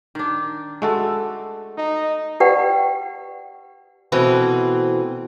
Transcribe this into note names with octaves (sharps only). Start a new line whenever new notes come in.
D#3 D4
G#3 A3 F#4 A4
D#4
G4 B4 D5 F#5 G5
B2 E3 A3 C4